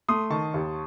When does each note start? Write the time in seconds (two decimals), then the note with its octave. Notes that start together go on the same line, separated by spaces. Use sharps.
0.09 A3 C6 D#6
0.30 D#3 A5 C#6
0.54 D#2